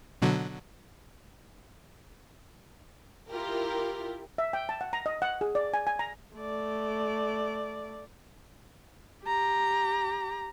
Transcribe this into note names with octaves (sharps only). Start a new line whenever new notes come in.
B2 D3 F#3
E4 F4 G4 A#4
E5
G5
A5
F#5
A#5
D#5
F#5
G#4
D5
G#5
G#5
A#5
A3 D5
G4 A#5